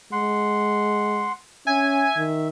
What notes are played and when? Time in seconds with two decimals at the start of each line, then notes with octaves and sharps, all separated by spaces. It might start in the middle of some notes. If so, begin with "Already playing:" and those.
0.12 G#3 F#5 C6
1.67 C#4 E5 G#5
2.17 D#3